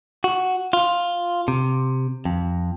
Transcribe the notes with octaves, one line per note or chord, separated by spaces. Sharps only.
F#4
F4
C3
F2